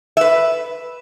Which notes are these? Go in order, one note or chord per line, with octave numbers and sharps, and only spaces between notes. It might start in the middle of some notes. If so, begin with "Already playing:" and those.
B4 E5